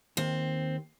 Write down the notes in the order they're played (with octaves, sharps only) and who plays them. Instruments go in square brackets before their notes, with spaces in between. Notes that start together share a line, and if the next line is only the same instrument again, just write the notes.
[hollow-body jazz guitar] D#2 [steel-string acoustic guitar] C4